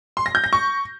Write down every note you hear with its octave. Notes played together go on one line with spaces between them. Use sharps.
C6
A#6
G6
A#6
C#6